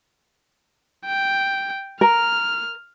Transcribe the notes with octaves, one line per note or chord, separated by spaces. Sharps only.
G5
A#4 F6